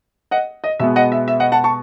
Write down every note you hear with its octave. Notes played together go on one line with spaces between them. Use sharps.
D#5 F#5
D#5
B2 G#3 B3 E5
D#5 F#5
E5
E5
D#5 F#5
F#5 A5
A5 C#6